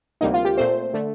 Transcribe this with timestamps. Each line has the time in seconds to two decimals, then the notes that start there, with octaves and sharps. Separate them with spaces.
0.21 D2 C3 G3 A#3 D#4
0.34 F4
0.45 G4
0.57 A#2 A3 C4 C5
0.94 D3 A3